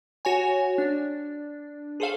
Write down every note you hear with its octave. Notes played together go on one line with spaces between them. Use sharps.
F#4 C#5 G#5
D4
G#4 A4 C5 C#5 F5